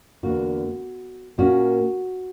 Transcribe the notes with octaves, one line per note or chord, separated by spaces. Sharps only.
E2 D3 A#3 F#4
A#2 A#3 C#4 F#4